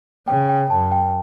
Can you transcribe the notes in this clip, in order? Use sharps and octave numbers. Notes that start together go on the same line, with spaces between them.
C#3 G5
G5
F#2 A5
G5